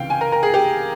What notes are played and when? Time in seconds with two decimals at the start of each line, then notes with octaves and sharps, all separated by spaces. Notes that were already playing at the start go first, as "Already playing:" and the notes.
Already playing: C#2 C3 E3 F5 G5
0.10 G#5
0.21 A#4
0.32 A#4
0.43 G#4
0.54 G4